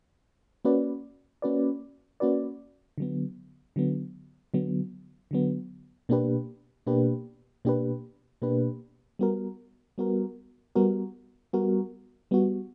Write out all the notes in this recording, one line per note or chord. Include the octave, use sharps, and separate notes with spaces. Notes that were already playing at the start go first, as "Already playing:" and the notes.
A#3 C#4 F#4 B4 D5
A#3 C#4 F#4 B4 D5
A#3 C#4 F#4 B4 D5
D3 F#3 B3
D3 F#3 B3
D3 F#3 B3
D3 F#3 B3
B2 A#3 D4 G4 B4
B2 A#3 D4 G4 B4
B2 A#3 D4 G4 B4
B2 A#3 D4 G4 B4
G3 B3 F#4 A#4
G3 B3 F#4 A#4
G3 B3 F#4 A#4
G3 B3 F#4 A#4
G3 B3 F#4